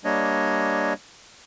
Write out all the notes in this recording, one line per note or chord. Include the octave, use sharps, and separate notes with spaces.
G3 A#3 D4 C#5 D#5